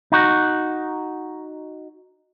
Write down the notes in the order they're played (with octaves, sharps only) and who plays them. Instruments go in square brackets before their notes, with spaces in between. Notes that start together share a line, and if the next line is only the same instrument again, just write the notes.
[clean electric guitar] D#4 F#4